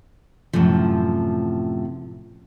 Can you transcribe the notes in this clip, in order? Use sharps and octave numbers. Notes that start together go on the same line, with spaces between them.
F#2 A2 C3 E3 F3